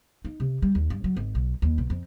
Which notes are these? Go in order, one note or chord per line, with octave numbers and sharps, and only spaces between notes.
D#4
C3
G3
D#2
G2
F#3
G#1
B1
D#2
B1
F2